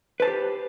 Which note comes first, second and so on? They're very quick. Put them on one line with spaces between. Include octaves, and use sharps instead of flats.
B4 A5 C5 G4